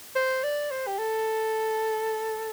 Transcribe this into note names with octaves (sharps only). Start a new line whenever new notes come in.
C5
D5
C5
G4
A4